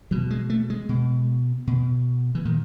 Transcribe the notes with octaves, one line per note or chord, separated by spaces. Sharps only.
B2 F#3
G#3
A3
G#3
B2
B2
E3
A#2 D#3